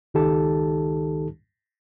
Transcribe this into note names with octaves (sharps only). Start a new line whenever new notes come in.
C#2 D#3 D#4 G4 A4 A5